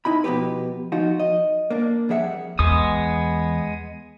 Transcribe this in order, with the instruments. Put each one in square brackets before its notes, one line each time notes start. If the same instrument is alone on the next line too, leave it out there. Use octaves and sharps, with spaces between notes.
[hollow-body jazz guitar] D#4 E4 B5
B2 E3 F3 G4 B4
F3 D#4 F4 F#4
D#5
A#3 D4
F2 G3 G#4 E5 F#5
[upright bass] E2 [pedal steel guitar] G#3 B3 D#6